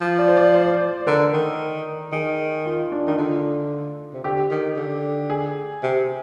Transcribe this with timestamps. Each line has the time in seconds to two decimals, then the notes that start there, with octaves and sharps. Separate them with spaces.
0.01 F3
0.18 D5
0.28 C5
0.37 D5
0.54 C5
1.07 D3 A#4
1.33 D#3
2.12 D#3 G#4
2.66 F4
2.92 D4
3.07 D#3 D#4
3.18 D3 F4
4.13 C3
4.24 D3 G4
4.50 D#3
4.76 D3
5.30 G#4
5.83 C3